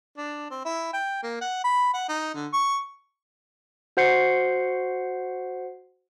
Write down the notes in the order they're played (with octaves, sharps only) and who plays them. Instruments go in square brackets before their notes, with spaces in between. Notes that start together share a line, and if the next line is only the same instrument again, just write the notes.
[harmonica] D4
C4
E4
G5
A#3
F#5
B5
F#5
D#4
D3
C#6
[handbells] F#4 C5 F#5 G6 C7 C#7